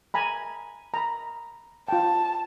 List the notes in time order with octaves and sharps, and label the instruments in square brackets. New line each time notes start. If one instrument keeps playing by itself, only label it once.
[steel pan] G#5 A#5 B5
A#5 B5
[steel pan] F4 G5 [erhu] A5